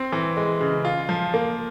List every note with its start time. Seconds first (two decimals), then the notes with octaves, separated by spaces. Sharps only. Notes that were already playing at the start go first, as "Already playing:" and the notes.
Already playing: C4
0.12 E3
0.36 G#3
0.61 C#3
0.85 F4
1.09 F3
1.34 A#3